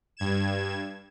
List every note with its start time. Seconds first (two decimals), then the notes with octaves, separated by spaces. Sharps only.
0.17 G2 G#6 E7